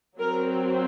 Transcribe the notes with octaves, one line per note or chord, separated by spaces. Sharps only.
F#3 C4 A#4